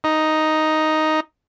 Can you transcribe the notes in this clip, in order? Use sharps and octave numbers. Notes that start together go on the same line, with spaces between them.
D#4